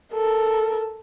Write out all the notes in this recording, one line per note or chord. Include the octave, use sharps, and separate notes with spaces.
A4 A#4